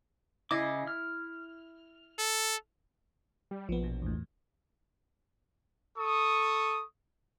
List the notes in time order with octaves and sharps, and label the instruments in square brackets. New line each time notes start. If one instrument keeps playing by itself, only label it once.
[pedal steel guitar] C#3 D#5 D6 [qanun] E4
[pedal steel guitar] F6
[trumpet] A4
[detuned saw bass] G3
[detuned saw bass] A#1 [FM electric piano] F3 B3
[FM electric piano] B2
E2 A2
[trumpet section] A4 C#6 D#6